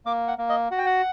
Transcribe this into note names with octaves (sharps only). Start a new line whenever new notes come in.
A#3 D6
F#5
A#3
D#5
F#4 F#5
G5
F#5